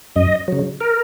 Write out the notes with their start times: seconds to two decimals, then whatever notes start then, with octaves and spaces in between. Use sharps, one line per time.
0.16 F#2 D#5
0.48 C#3 F#3
0.81 A#4